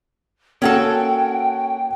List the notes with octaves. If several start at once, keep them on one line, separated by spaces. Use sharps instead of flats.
A#3 C#4 F#4 A4 F#5 G5